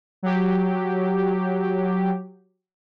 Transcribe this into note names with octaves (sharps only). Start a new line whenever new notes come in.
F#3 G4